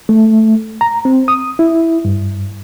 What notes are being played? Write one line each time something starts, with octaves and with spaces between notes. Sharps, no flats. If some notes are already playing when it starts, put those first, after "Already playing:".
A3
A#5
C4
D#6
E4
G2